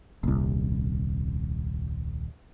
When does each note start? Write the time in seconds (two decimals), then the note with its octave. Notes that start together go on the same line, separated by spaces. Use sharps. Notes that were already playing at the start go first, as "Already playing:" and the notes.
0.23 D#1 C2